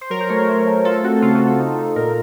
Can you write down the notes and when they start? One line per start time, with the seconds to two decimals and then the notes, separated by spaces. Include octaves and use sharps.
0.01 C5
0.10 F#3 A#4
0.20 C5
0.29 A3 C#5
0.48 A3 C5
0.67 A3
0.85 F4 A4
1.04 C4 F#4
1.22 C#3 F4
1.35 F#4
1.41 F4
1.47 A4
1.59 D#4
1.78 D#4
1.96 A#2 A#4